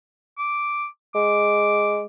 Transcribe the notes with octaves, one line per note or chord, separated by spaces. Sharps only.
D6
G#3 D6